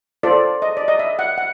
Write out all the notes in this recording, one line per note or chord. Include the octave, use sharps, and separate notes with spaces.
F4 A4 C5 D5
D#5
D5
D#5
E5
F#5
F#5